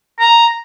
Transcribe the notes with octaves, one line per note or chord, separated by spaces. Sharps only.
A#5